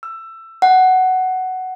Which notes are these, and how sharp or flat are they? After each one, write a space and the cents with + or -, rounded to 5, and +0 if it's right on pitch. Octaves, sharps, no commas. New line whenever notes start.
E6 +15
F#5 +10